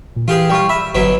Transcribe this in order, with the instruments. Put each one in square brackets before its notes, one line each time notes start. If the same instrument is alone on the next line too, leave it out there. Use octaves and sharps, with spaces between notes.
[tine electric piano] A#2
[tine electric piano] E3 [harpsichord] F4 G4 G#4
[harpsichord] G3 F4 [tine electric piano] G5 C#6
[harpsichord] E5 [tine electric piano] B5
[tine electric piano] G1 [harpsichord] B2 F#3 E4